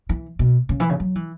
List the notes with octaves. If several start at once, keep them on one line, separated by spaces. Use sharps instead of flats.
E3
B2
C#3
E3
C#3
F#3
E3